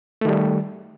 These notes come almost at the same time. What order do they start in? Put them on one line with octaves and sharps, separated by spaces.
A3 D#3 G3